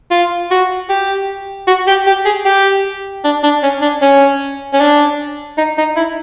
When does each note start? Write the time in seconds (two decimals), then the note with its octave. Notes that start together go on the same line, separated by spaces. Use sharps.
0.11 F4
0.51 F#4
0.90 G4
1.67 F#4
1.87 G4
2.07 G4
2.25 G#4
2.45 G4
3.24 D4
3.43 D4
3.63 C#4
3.82 D4
4.02 C#4
4.73 C#4
4.80 D4
5.58 D#4
5.78 D#4
5.96 E4